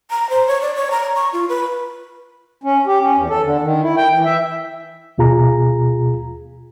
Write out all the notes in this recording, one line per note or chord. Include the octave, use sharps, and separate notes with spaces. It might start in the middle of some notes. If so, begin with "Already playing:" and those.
A#5
C5
C#5
D5
C#5
A#5
C#6
F4
B4
C#4
G4
C#4
E2
A4
D3
D#3
E4
G5
E3
E5
D#2 B2 F4 G#4 A#5